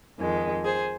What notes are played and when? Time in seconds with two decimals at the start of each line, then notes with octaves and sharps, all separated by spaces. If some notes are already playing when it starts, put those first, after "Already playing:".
0.19 F2 D#3 G#3
0.65 G#4 C5